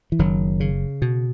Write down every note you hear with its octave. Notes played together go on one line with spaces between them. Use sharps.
E3
F#1 D#3 F#3
C#3
B2